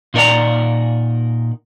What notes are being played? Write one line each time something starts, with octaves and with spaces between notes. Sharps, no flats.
A#2 D#4 A#4 D5 F#5 A#5